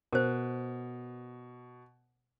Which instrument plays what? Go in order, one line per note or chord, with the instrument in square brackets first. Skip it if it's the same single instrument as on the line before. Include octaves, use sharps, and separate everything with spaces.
[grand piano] B2 [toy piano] A#4 C5